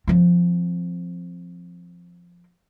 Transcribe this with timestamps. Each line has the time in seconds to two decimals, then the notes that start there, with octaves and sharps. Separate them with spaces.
0.08 F3 C4